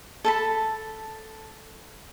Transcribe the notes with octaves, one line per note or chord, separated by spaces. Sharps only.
A4 A5 B5